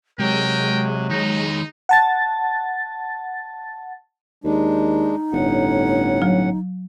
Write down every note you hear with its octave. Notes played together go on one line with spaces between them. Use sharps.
C3 F#3 G#3 G4 A#4 G5
D#3 D#4 C#5
F#5 A5 A6
D#2 G#3 D4 D#4
G1 A2 C#4 F#5
F#3